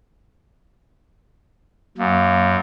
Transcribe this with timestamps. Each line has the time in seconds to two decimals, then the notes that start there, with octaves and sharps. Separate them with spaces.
1.98 F#2 A#3